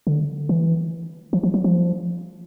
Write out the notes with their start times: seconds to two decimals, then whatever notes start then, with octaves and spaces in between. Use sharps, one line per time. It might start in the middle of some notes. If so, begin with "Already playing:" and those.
0.07 D3
0.49 E3
1.33 F3
1.43 F3
1.54 F#3
1.64 F3